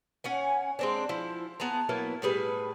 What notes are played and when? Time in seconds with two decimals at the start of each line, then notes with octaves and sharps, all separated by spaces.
0.24 C#4 F#5 G#5
0.79 G#3 C4 D4
1.09 F3 E4
1.60 B3 G#4 A5 A#5
1.89 F#3 A#3 B3 E4
2.22 A2 G3 G#4 B4